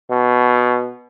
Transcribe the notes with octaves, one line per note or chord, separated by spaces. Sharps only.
B2